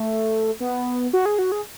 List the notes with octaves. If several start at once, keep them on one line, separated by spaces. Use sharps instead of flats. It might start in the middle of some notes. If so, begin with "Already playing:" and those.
Already playing: A3
B3
F#4
G#4
F#4
G#4